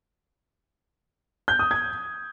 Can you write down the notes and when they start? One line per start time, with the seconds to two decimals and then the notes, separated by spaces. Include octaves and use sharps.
1.48 G6
1.59 D#6
1.71 G#6